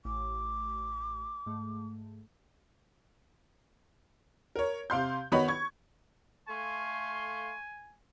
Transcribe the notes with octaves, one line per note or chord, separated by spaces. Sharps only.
A1 D6
G#2 A3
A#4 C#5
C3 F5 C6 G6
D#3 B3 F#4 C#5 D#5 B5
C#6 G#6
A3 F5 G#5 C6 C#6